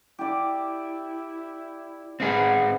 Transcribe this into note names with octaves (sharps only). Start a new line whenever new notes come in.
E4 G4 D5
B3 C4 D#4 G#4 F5